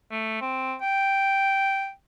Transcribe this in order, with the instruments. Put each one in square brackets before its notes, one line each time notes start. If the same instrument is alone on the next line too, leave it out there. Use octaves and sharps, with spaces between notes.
[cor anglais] A3
C4
G5